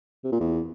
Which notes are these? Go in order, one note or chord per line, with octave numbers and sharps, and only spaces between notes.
C3
A#2
E2